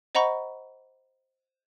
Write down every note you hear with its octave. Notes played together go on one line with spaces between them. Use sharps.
C5 D#5 F#5 A#5 B5 C#6